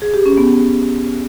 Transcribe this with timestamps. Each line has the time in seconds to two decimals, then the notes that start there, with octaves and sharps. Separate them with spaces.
0.02 G#4
0.14 G4
0.26 C#4
0.38 B3